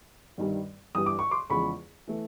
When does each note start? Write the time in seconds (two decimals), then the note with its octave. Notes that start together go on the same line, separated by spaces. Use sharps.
0.38 G2 D#3 G3
0.95 G2 E3 G3 D#6
1.06 D6
1.19 C#6
1.31 C6 D6
1.50 E2 C#3 F3 G#3 B5 C#6
2.07 E3 A3